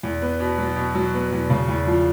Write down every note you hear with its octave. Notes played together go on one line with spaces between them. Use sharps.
E2
B3
B2
F#3
B2
F#3
B3
E2
C#3
E2
F3